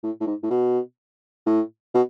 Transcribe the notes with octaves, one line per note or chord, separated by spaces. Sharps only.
A2
A2
G#2
A2
B2
A2
B2